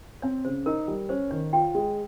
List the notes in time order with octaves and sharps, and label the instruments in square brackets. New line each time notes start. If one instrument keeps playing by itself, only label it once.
[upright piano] C4 [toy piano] C#5
[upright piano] C#3 [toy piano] C5
[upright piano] D#4 [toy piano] A#4
[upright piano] G3
[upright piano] C#4 [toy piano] C5
[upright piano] D#3 [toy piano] C#5
[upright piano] F4 [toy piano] G5
[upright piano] G#3